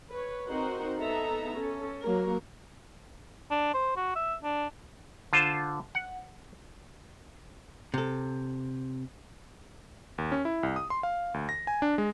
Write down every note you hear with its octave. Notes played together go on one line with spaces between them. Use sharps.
B4 C#5
C4 D#4 F#4 A#4 C5 F#5
B3 D#4 A4 E5 A#5
C#4 A4
F#3 A#3 A#4
D4
C5
F#4
E5
D4
D3 F4 C5 A5
F#5
C3 A4
D#2
C#4
E4
C2
D#6
C6
F5
D2
A#6
G#5
D4
G#3